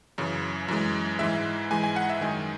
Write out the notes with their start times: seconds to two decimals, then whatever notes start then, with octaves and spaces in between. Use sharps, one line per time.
0.18 F#2 C#3 E3
0.68 F#2 E3 G#3
1.19 G#2 E3 G#3 E5
1.71 G#2 E3 G#3 G#5
1.84 G#5
1.96 F#5
2.10 E5
2.21 F#2 D#3 G#3 G#5